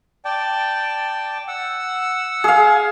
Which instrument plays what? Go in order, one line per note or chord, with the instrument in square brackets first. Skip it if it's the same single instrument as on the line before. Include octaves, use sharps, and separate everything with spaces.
[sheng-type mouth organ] D5 G5 A5
F#5 E6
[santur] G#4 F5